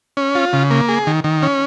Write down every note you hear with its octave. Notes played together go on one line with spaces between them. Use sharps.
C#4
F4
C#3
A#3
G#4
D#3
D#3
C#4